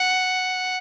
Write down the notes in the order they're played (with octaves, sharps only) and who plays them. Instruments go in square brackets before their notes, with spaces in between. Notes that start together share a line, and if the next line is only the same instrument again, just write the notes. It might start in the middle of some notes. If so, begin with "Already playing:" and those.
Already playing: [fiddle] F#5